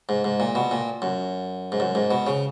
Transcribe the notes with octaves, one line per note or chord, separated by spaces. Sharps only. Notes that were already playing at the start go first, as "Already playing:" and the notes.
G#2
G#2
A#2
B2
A#2
F#2
G#2
F#2
G#2
B2
C#3